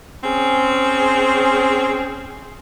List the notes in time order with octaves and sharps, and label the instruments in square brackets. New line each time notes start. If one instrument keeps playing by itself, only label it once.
[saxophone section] C4 C#4 G#4